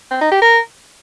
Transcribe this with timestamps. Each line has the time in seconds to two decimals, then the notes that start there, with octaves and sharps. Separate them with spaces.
0.11 C4
0.21 D#4
0.31 G4
0.42 A#4